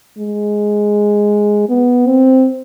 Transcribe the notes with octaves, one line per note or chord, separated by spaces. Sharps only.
G#3
B3
C4